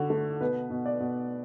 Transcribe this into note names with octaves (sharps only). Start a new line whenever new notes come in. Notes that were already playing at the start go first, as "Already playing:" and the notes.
Already playing: D3 F#4
A3
B2 B4
B2
D5
B2